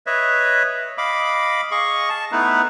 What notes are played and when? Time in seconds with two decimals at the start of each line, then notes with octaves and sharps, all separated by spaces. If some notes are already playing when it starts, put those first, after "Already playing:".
0.06 B4 C#5 D#5 E5
0.98 D#5 F5 B5 D6
1.71 G#4 D#5 F5 C#6
2.09 A5
2.32 A3 B3 D#4 E4 B4